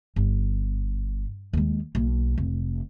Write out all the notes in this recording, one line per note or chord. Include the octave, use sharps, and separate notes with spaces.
G1
D#2 G#3
B1 A#3
F1